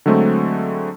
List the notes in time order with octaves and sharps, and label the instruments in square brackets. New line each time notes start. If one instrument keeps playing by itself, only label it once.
[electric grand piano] D3 F#3 G#3 A3 C4